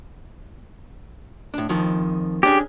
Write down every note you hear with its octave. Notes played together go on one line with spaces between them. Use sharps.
A2 D4
F2 D#3 F3
C#4 D4 G4 G#4